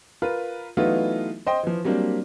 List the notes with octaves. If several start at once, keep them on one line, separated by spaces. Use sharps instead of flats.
F4 A#4 B4
E3 F#3 A3 B3 D#4 F4
C5 D#5 G5 C6
E3 F3
F#3 G3 A#3 C4 D4